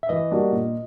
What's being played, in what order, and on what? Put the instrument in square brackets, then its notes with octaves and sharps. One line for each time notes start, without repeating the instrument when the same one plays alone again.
[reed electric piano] E5
[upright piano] E3 [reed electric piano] D#5
[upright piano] G3 A#3 D4 F#4
A#2